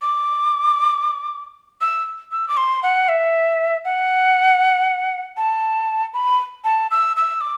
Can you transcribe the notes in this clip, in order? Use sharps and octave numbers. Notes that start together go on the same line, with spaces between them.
D6
E6
E6
D6
C6
F#5
E5
F#5
A5
B5
A5
E6
E6
D6